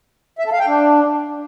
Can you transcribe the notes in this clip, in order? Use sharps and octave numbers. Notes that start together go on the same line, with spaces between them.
E5
A4
F5
G5
D4